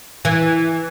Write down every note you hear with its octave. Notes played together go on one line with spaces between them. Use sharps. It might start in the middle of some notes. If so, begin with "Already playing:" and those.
E3